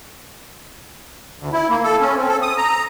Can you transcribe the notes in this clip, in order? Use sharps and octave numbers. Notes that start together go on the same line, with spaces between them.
D2
E4
A#3
A4
C#4
C4
A4
D#6
A#5